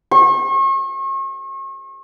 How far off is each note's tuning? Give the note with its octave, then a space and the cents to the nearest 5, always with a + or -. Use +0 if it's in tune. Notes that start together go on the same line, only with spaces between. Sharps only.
C#6 -40